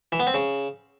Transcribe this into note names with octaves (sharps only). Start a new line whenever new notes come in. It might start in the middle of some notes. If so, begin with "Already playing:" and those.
E3
B3
C4
C#3